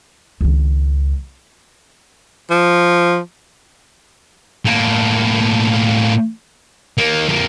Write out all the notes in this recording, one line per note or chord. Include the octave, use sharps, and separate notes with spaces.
C#2 D#3
F3
A2 A#3
D#3 A#3
F2 A#3